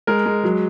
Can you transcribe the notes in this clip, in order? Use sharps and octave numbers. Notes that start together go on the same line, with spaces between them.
G#3 A#4
G#3
F#3